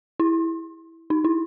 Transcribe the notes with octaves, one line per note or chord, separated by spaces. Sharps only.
E4
D#4
E4